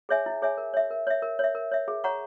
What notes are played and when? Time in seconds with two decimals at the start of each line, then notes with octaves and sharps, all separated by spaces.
0.09 G#4 C#5 E5 G#5
0.26 E4
0.42 G#4 C#5 E5 G#5
0.57 A#4
0.74 C#5 E5
0.90 A#4
1.07 C#5 E5
1.22 A#4
1.39 C#5 E5
1.55 A#4
1.71 C#5 E5
1.88 G#4
2.04 C#5 F#5 A#5 C#6